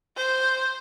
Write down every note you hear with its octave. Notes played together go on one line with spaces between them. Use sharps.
C5